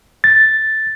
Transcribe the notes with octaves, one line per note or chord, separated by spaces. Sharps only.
A6